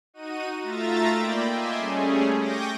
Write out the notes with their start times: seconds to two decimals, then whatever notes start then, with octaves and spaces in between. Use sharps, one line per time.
0.14 D#4 F#4 D#7
0.63 A3 F4 E5 A#5 A6
1.14 A#3 D5 G5 B5
1.48 D#5 E5 G#5 C6 D6
1.78 G3 A3 C#4 G#4
2.39 G5 C#6 D6 G6 A#6 D#7